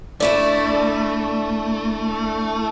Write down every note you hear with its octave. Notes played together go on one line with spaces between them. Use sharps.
A3 D4 E4 D5